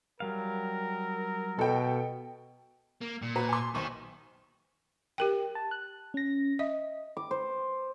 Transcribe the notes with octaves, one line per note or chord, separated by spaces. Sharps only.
F#3 G3 A#4 F5
B2 A4 G5
A#3
A#2
F#4 B4 A#5
G#5 C6
B1 D#3 C5 C#6
G4 A#4 G5
A5
F#6
C#4 A#6
D#5 E5
D6
C5